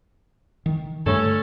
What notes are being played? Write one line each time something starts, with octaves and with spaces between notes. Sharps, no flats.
D#3
G2 D3 A3 C#4 A4